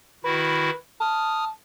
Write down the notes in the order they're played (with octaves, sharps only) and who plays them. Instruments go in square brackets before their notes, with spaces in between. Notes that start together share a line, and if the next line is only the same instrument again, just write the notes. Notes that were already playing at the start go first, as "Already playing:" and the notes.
[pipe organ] D#3 E4 F#4 [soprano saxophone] B4
[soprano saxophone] A5 [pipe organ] D#6 F6